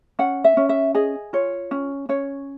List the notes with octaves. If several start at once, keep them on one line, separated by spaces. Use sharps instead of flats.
C#4 F#5
E5
C#4
E5
G#4 D#5
F4 C#5
C#4
C#4 C#5